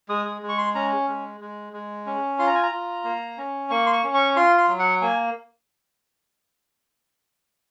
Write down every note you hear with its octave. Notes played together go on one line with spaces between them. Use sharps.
G#3 D#6
D#6
G#3
C#6
C6
C#4 A#5
G#3
G#3
G#3
C#4
F4 C6
A#5
G#5
A#5
F4
A#3
C#4
A#3 C#6
C6
C#6
C#4
C#6
F4 C6
C6
F#3
F#5
A#3 G#5